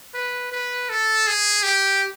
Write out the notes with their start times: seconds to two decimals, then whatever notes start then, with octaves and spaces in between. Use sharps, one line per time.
0.14 B4
0.52 B4
0.89 A4
1.27 G#4
1.63 G4